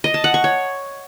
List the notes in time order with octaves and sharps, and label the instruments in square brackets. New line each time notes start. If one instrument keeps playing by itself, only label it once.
[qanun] D#5
A5
F#5
C#6
C#5